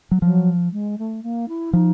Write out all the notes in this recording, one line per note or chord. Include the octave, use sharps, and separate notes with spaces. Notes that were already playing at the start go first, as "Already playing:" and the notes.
F#3
F3 F#3
G#3
A3
A#3
E4
F3 D#4